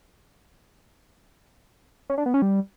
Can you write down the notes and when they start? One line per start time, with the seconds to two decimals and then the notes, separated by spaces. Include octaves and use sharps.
2.10 C#4
2.18 D4
2.26 B3
2.34 C#4
2.42 G3